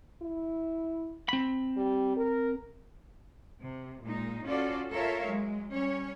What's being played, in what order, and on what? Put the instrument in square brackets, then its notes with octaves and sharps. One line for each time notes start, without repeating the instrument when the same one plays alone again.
[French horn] E4
[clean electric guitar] C4 B5
[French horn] G3
A#4
[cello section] C3
A#2 G#3 D#4
C#4 F4 F#4 A4 D5
F4 A4 A#4 C#5 E5 F5
F#3 G#3
G3 C#4 C#5